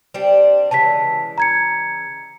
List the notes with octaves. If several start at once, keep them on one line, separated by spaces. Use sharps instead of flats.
G3 C4 D4
C#3 E3 G#3 A5 B6
A#5 G#6 C#7